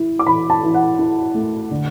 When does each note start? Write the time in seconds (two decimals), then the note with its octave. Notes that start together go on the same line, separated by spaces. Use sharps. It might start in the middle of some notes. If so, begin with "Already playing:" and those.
Already playing: E3 E4
0.19 D6
0.26 E3 B5
0.50 A5
0.63 E3
0.74 F#5
0.99 E4
1.34 A3
1.71 D3